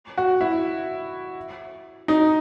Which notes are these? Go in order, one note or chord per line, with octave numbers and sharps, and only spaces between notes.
F#4
E4
D#4